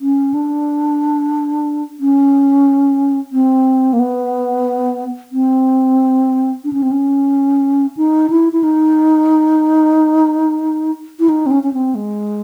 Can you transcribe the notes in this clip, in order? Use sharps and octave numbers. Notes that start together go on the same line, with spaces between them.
C#4
D4
C#4
C4
A#3
B3
C4
D4
C#4
C4
C#4
D#4
E4
E4
D#4
E4
D#4
C4
C#4
C#4
C4
G#3